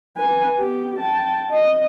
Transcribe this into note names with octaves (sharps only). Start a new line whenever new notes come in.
B4 G#5
B3 G4
G5 A5
D#5